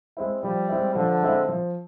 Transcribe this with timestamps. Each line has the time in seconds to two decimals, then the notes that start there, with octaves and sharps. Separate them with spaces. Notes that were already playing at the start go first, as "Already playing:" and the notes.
0.17 G#3 C4 E4
0.43 F3 G3
0.69 G#3 C4 E4
0.95 D3 F3
1.21 G#3 C4 E4
1.48 F3